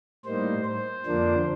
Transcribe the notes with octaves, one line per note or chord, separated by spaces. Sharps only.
A2 G3 A#3 D#4 C5
C5
F2 D3 F3 A#3 D4